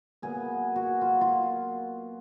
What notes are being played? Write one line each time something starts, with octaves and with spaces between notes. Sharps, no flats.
A#2 F#3 B3 G#4
F#4
F4
F4